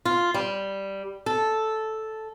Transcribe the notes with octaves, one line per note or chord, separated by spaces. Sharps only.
F4
G3
A4